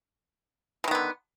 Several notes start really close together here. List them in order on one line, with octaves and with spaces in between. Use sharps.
B2 D#3 B3 D3